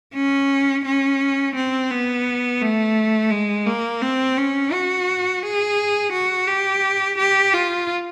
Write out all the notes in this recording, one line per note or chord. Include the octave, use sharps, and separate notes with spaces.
C#4
C#4
C4
B3
A3
G#3
A#3
C4
C#4
F#4
G#4
F#4
G4
G4
F4